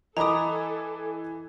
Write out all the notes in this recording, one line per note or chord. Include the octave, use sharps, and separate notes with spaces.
E3 A4 D#5 A#5 B5 D6 D#6